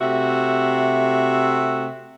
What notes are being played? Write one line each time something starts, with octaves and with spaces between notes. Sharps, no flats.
C3 A3 F#4 E5